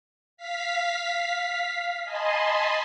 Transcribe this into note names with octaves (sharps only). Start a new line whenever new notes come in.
F5 B6
D#5 G#5 A5 B5 C6